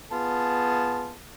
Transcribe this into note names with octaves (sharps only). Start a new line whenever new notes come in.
B3 F4 G#4 A5